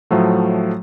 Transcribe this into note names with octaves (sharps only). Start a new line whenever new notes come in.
A2 F3 F#3 A3